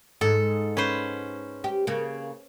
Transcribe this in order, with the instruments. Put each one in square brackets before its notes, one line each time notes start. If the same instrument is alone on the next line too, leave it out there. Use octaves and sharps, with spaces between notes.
[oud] G#2 [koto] A4
[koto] C#4 B4 C5
[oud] G4
C#3 A#3